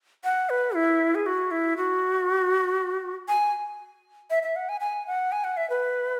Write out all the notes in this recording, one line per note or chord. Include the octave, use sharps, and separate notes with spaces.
F#5
B4
E4
G#4
F#4
E4
F#4
G#5
E5
E5
F#5
G#5
G#5
F#5
G#5
F#5
E5
B4